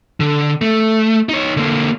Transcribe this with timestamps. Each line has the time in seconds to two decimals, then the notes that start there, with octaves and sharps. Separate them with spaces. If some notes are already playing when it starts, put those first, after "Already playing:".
0.20 D3
0.61 A3
1.29 D#4 C#5
1.57 D3 A#3